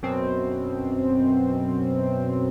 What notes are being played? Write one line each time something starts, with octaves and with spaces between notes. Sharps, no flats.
F#2 B2 C4